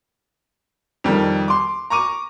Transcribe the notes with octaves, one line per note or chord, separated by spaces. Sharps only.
F2 D#3 G3 A#3
C6 D6
A#5 C#6 D6 D#7